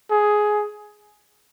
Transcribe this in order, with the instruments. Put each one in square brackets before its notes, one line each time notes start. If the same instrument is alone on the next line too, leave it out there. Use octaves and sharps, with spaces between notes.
[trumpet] G#4